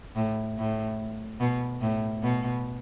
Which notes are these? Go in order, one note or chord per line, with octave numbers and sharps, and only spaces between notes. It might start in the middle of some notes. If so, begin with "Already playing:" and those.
A2
A2
B2
A2
B2